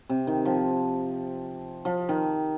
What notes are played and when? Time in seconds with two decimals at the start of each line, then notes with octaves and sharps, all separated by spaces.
0.09 C3
0.27 D#3
0.45 F3
1.85 F3
2.09 D#3